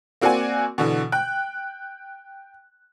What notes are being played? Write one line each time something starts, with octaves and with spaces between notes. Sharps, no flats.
A#3 C4 F#4 D5 F#5 G#5
B2 D3 E3
G5 F#6